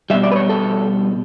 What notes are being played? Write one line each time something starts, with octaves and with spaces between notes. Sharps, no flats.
B2 G3 E5
D5
B4
C#5
A4